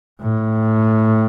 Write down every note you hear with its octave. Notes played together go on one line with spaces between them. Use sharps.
A2